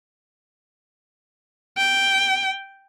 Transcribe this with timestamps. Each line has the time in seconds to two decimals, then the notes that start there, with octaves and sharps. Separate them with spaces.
1.77 G5